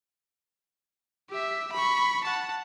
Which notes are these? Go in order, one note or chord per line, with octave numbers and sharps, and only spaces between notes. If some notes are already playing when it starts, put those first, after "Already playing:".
G4 E5
B5 C#6
F#5 A5